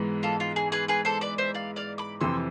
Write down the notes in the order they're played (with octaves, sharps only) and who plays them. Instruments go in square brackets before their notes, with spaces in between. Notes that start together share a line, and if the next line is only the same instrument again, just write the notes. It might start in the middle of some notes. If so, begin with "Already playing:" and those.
Already playing: [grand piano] G#2 E3 G#3 B3
[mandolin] F4 A4
F4
G#4
G#4 B4
G#4 B4
A4 C5
B4 D5
C5 E5
D5 F5
D5 F5
B5 D6
[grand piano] F2 C3 E3 [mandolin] C6 E6